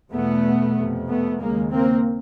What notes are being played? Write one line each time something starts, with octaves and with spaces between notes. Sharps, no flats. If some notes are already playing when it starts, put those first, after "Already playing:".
E2 B2 A3 B3
F2 C3
A3 B3
D#2 C#3 G#3 A#3
A#3 C4